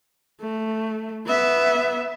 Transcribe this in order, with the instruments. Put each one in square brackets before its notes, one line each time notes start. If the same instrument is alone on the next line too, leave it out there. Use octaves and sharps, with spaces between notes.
[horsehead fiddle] A3
B3 E5